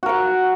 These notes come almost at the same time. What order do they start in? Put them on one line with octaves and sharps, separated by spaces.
F#4 A#4 F#5